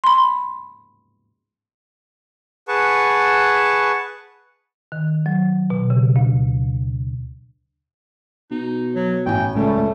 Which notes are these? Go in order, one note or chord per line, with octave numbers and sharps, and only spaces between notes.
B5 C6
G#4 B4 F#5 A5 C#6
D#3
F#3
B2
C#3
D2
B2 D#4
F#3
A1 E4 G5 G#5
C#2 G3 A3